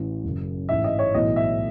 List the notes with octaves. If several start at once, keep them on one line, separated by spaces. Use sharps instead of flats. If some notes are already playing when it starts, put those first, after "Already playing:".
Already playing: A1 E3
F#1 F#2 C#3
A1 G#2 E3 E5
D#5
C#5
B1 A2 E3 D#5
E5